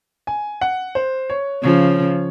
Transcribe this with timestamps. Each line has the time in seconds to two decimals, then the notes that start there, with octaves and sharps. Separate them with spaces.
0.27 G#5
0.61 F#5
0.95 C5
1.30 C#5
1.62 C#3 F3 C#5